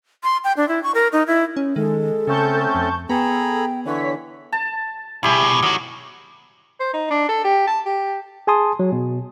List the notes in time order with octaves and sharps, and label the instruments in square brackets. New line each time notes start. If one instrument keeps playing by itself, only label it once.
[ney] C6
G5
D4
E4
C#6
A#4
D#4
E4
[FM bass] C#4
[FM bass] D#3 [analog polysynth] G#3 [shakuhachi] A4
[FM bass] C#3 [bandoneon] A3 C4 C#4 [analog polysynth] A5 C#6 G6
[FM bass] F2
[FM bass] B3 [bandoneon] G#4 A#5 B5 [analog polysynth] A4 [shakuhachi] G5
[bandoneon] D3 E3 [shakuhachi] B4 [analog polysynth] C#5 B6
[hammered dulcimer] A5
[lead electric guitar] C2 B2 [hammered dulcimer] E4 G4 G#4
[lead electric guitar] D#3 F#4 [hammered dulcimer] F#3
[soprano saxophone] C5
D#4
D4
A4
G4
A5
G4
[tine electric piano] G#4 G#5 A5 C6 D#6
F#3
B2